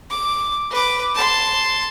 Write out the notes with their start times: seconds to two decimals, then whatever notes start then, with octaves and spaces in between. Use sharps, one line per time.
0.10 D6
0.71 B4 D6
1.15 A5 C6